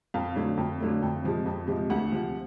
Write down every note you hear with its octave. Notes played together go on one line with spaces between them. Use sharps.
F2 F5
D3 F#3 A3
F2
D3 F#3 A3
F2
C3 F3 G#3
F2
C3 F3 G#3
D2 F#5
C3 F3